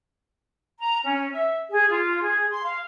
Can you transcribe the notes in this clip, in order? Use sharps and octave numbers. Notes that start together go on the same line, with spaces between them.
A#5
C#4
E5
G#4
F4
G#4
C6
F5